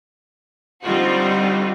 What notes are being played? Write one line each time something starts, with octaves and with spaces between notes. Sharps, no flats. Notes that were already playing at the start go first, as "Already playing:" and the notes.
D3 G3 C4 D#4 F4 F#4